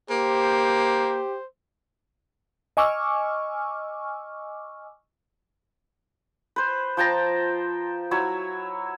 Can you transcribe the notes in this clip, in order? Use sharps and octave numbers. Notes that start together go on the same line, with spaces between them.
A#3 G4 C5
D#5 G#5 C#6 D6 E6 F6
B4 C5
F3 G5 A5 A#5
F#3 E4 C#5 E5